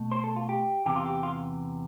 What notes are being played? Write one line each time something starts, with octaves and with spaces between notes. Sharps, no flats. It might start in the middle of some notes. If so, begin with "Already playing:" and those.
Already playing: B2 A3
C5
A4
F4
G4
E2 C3 E3 G4
F4
G4
F4